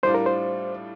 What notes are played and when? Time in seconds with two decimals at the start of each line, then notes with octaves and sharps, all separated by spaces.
0.03 A2 G3 D4 F4 C5
0.14 A#4
0.26 C5